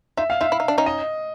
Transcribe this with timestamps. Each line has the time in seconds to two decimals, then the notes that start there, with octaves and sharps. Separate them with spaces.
0.17 D#4 F4 E5
0.30 F5
0.41 D#4 F4 E5
0.52 E4
0.60 D#4
0.68 D4
0.78 C#4 D#4
0.86 D#5